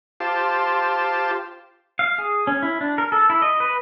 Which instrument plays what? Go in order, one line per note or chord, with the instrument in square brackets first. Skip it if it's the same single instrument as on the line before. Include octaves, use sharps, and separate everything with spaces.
[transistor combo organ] F4 G4 C5 A5
[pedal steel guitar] F5
G#4
C#4
E4
D4
A#4
A4
E4
D#5
B4